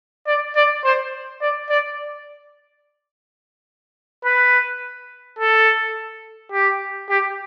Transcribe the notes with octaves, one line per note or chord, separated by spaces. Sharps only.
D5
D5
C5
D5
D5
B4
A4
G4
G4